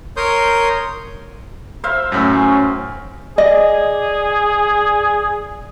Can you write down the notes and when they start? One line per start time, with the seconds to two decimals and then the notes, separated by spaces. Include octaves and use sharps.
0.17 A#4 C#5 C6 D#6 G6
1.84 C5 E5 F5
2.12 F#2 A2 C#4
3.38 G#4 D5 D#5